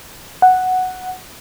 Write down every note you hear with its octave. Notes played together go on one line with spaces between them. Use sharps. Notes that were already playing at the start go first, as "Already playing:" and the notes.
F#5